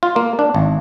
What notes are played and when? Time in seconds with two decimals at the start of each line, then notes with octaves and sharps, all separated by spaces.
0.03 F4
0.16 A#3
0.39 D4
0.54 G#1